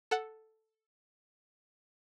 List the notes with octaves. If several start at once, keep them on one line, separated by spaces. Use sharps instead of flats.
A4 F#5